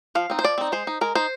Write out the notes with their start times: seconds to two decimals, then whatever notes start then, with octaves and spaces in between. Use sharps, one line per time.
0.15 F3 F5
0.30 C4 D#4
0.39 C5
0.44 F3 D5
0.58 C4 D#4
0.72 G#3 C5
0.87 D#4
1.01 G#3 A#4
1.15 D#4 C5